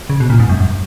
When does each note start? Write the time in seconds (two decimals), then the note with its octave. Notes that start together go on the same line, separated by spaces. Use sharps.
0.10 C#3
0.20 B2
0.30 A#2
0.40 G#2
0.49 F#2
0.60 F#2